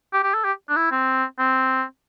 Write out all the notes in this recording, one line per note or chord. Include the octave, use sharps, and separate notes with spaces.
G4
G4
A4
G4
D4
E4
C4
C4